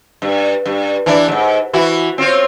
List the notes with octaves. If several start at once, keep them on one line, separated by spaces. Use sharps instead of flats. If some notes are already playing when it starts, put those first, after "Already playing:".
G2
G2
E3 D4 E4
E2 G#2
E3 E4 F#4
C4 F4 C#5